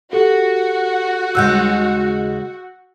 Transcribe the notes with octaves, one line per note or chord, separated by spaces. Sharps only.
F#4 G4 A4
D#2 C#3 G#3 E6 F#6 G6